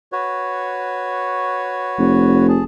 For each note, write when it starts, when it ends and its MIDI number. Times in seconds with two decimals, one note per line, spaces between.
0.12 2.47 66
0.12 2.47 71
0.12 2.47 73
1.99 2.63 29
2.49 2.64 68
2.49 2.64 81